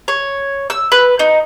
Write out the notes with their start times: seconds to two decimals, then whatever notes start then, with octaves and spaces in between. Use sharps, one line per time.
0.08 C#5
0.70 E6
0.92 B4
1.19 D#4